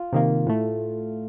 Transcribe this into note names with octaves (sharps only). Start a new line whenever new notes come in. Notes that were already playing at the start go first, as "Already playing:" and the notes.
Already playing: F4
C3 D#3 A#3
A2 A3